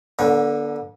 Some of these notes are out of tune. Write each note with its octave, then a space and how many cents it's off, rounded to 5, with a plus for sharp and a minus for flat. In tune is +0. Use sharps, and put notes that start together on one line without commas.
D3 +0 B3 -45 C#5 +10